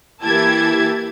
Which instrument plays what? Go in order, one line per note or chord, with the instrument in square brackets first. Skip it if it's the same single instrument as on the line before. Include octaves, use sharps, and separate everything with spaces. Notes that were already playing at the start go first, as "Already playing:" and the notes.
[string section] E3 A#3 E4 G4 A5 G#6